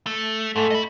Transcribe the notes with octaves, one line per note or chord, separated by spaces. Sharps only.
A3
G#2 A3
D#5 B5